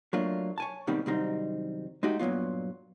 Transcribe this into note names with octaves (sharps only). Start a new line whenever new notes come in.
F#3 A3 A#3 D4 F4
C#5 G#5 A5
G#2 B2 D#3 G3 C4
C2 F#2 D#3 G3 C4 D#4
G#3 A3 D#4 F#4 G4
G2 A#2 F#3 B3 F4